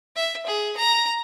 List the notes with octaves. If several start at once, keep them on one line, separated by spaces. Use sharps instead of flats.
E5
G#4
A#5